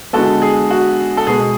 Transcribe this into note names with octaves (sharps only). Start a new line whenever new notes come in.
D3 G#3 B3 F#4 A4
G#4
F#4
A4
B2 G#3 B3 G#4